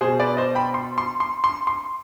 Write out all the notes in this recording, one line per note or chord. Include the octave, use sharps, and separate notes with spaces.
B2 G#4 C5
B4 D5
C5 D#5
G5 B5
C6
C6
C6
C6
C6